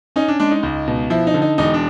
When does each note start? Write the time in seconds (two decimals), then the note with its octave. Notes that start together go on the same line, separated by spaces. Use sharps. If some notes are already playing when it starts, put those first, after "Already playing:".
0.16 C#4 D#4
0.28 D4
0.40 G#3 D4
0.51 D#4
0.63 C#2
0.88 B2
1.10 F3 E4
1.27 D#4
1.34 D3
1.42 D#4
1.58 E1 D#4
1.74 D4